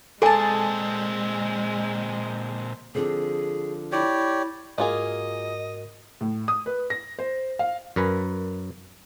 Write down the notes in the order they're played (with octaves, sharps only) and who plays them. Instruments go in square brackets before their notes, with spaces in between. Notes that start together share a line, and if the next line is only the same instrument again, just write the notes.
[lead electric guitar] A#2 C4 [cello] G#3 [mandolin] G#4 A5 [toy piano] A4 G#5
[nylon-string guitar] D3 F3 C4 [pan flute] G#4
[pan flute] E4 [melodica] G4 C#5 D5
[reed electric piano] G#2 F#4 A#4 [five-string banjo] A#3 F4 G#4 [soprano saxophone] D#5
[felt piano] A2
D#6
B4
A#6
C5
F5
[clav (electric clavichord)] F#2 A#4 B4 G#5